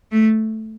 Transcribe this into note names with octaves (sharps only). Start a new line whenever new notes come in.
A3